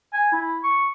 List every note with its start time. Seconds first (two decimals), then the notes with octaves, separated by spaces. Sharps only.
0.14 G#5
0.32 E4
0.64 C#6